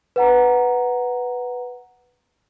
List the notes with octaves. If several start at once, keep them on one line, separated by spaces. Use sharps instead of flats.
B4 F#5 A#5